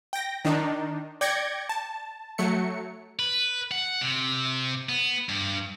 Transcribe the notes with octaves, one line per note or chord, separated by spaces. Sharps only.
G5 A#6
D#3 D4 D#4
D5 G5 G6 G#6 A#6 C#7
A5
F#3 A3 C#7
B4
F#5
C3
B3
G2